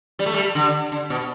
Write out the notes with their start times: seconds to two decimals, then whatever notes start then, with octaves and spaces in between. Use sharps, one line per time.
0.19 G3
0.26 A3
0.34 G3
0.55 D3
0.92 D3
1.10 B2